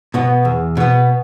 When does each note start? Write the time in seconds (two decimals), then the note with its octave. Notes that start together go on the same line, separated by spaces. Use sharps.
0.14 B2 B3
0.45 E2
0.77 B2 B3